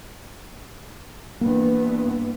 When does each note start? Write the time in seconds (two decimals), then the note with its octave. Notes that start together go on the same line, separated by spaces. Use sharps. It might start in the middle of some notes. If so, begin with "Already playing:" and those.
1.41 G2 E3 A#3 B3 D4